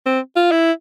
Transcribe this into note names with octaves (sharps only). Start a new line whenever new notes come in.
C4
F4
E4